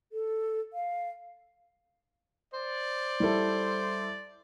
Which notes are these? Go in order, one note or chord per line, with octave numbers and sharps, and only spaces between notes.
A4
F5
C5 D5
G3 E4 A4